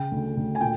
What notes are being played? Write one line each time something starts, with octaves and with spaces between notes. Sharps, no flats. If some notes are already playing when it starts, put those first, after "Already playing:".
Already playing: C#3 G5
D2
D2
G#5
A#2 G5